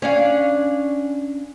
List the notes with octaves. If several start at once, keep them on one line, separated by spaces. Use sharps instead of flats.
C#4 D4 F5